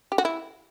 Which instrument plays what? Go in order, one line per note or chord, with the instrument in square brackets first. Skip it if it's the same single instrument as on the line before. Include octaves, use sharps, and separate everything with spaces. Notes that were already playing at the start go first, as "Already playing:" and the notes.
[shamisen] G4
F#4
E4